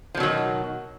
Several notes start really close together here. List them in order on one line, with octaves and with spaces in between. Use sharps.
F3 B2 F#3 D#3